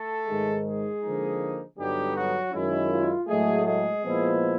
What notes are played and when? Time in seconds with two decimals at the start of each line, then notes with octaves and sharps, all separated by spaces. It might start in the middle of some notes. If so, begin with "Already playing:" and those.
Already playing: A3 A4
0.28 G#2 D#3 G#3
0.65 G#3 G#4
1.03 D3 F3 A#3 D#4
1.77 G2 D3 F#3 G3 B3 D#4 G4
2.16 F#3 F#4
2.53 F#2 D#3 G#3 C#4 E4
2.91 F4
3.28 A2 F#3 G#3 A3 G#4
3.66 G#3 G#4
4.04 A#2 F3 G#3 B3 E4